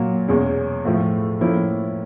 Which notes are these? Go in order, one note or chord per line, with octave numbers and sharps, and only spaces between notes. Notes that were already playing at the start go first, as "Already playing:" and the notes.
Already playing: A#2 F#3 A#3
E2 B2 G#3 C#4
A2 F3 A3
A2 F3 A#3 C#4 E4